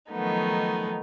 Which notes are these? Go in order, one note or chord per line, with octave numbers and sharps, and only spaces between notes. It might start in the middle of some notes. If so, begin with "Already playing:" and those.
D#3 F3 F#3 A3 B3 D#4